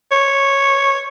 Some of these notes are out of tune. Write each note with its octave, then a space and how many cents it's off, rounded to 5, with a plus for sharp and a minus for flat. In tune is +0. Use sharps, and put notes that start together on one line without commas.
C#5 -5